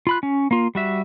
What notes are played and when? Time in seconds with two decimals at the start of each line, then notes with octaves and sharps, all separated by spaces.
0.07 F4 B5 F#6
0.23 C#4
0.51 A#3 F4
0.75 G3 F#4 E5